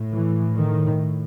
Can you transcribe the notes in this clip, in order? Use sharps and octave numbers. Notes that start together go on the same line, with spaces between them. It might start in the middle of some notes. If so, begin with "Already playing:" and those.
Already playing: A2
E3
D#3